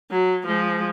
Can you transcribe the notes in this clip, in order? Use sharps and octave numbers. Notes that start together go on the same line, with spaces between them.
F#3
F3 G#3